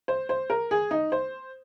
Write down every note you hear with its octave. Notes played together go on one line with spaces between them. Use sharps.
C5
C5
A#4
G#4
D#4
C5